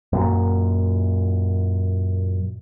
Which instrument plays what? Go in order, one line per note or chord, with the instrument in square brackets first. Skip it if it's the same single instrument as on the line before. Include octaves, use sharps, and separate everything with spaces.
[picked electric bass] F#2 A#2